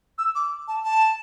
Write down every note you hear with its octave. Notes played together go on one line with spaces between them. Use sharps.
E6
D6
A5
A5